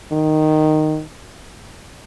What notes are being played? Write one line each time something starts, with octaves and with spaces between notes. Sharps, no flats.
D#3